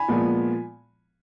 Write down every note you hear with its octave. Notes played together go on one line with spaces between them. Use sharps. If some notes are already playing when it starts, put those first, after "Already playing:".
Already playing: G#5 B5
A#2 F3 G#3 B3